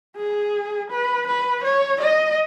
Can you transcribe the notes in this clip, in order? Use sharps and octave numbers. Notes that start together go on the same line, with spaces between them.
G#4
B4
B4
C#5
D#5